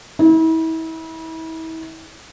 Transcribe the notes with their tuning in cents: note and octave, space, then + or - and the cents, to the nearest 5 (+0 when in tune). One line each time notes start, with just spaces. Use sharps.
E4 -35